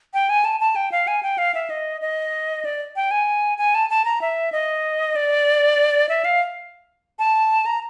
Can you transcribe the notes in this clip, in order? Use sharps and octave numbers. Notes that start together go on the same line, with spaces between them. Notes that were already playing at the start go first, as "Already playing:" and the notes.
G5
G#5
A5
A5
G5
F5
G#5
G5
F5
E5
D#5
D#5
D5
G5
G#5
G#5
A5
A5
A#5
E5
D#5
D5
E5
F5
A5
A#5